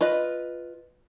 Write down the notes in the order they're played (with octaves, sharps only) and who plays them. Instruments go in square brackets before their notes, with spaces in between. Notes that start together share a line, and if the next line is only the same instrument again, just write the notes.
[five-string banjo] F4 B4 D#5